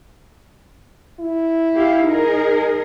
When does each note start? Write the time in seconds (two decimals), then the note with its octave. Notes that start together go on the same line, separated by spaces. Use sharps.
1.20 E4
1.75 G4 F5
2.05 D#4 G#4 A#4